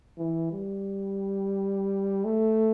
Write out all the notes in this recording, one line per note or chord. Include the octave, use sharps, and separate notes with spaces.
E3
G3
A3